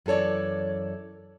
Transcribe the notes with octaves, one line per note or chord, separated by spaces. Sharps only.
F#2 E3 A4 C#5 D5